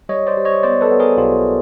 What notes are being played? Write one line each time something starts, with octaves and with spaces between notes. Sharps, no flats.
G3 C#5 D#5
C5 D5
G3
C#5 D#5
B3 C5 D5
A4 B4
B3
G#4 A#4
B1 F4 G4